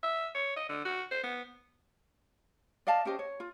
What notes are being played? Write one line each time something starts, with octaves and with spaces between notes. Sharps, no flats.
E5
C#5
D#5
D3
F#4
C5
B3
D5 D#5 F5 A5
C#4 G4 C5 D#5
C#5
F4